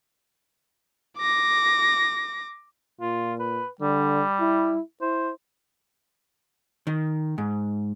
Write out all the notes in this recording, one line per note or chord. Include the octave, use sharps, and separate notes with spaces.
D6 A#6
A#2 F4
B4
D3 G3
E4
E4 C5
D#3
G#2